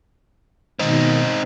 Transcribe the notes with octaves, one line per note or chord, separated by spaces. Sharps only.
B2 D#3 C4 D#4